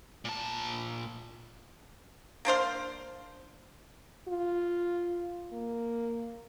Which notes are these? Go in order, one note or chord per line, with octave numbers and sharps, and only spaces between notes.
A#2 A5
A#3 D4 C5 F5
F4
A#3